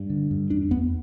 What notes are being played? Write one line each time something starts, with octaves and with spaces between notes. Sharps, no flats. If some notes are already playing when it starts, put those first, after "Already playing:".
Already playing: G2
D3
G2
E2 D4
E2 B3